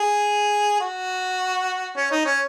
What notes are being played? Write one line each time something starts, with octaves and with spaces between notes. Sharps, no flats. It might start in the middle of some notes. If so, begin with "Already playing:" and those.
Already playing: G#4
F#4
C#4
D#4
C#4